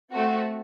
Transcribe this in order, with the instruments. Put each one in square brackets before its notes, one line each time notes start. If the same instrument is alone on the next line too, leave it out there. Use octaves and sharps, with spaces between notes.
[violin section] A3 C4 F#4